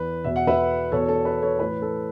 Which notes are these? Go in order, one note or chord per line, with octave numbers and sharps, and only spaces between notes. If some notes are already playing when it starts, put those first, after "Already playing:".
Already playing: E2 E3 B4
E2 B2 E5
F#5
B4 E5
E2 B2 A4 C#5
A4
B4
A4 C#5
A2 E3 B4
A4